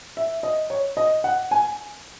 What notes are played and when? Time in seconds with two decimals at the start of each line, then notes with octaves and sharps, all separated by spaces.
0.17 E5
0.43 D#5
0.70 C#5
0.97 D#5
1.24 F#5
1.51 G#5